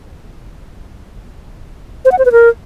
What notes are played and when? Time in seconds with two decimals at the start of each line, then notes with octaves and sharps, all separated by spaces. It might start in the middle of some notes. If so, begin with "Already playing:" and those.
2.05 C5
2.12 F#5
2.19 C5
2.25 B4
2.32 A#4